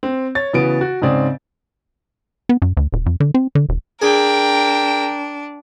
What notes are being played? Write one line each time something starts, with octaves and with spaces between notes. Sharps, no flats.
C4
C#5 A6
C#3 E3 B3 F#4 D7
F#4
G#2 C#3 C4 D5
B3
F#2
D2
D#1
F2
D3
C4
D3
E1
D4 G#4 A#4 G5